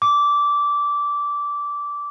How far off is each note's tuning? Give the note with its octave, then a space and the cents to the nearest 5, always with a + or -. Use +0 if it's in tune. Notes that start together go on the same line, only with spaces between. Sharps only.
D6 -15